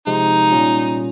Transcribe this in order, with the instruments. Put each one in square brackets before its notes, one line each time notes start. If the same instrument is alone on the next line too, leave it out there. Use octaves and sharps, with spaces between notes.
[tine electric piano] C3 F3 G#3 C4 [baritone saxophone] D#4
[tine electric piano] A#2 G3 C#4 F4